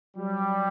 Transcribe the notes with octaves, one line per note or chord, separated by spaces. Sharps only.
F#3 G3